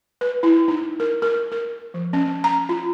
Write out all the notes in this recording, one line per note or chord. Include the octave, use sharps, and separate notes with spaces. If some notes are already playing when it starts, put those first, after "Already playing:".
B4
E4
D#4
A#4
A#4
A#4
F3
C#4
A#5
F4